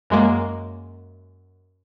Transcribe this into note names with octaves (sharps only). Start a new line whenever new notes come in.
F#2 G#3 A#3